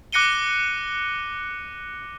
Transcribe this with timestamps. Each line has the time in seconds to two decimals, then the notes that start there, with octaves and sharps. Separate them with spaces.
0.13 D6 F#6 A#6 C#7 D#7 G7